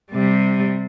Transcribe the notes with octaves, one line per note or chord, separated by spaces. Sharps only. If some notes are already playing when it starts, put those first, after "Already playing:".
C3 G3